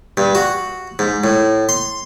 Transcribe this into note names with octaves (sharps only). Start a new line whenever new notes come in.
G2
F#4
G#2
A2
C6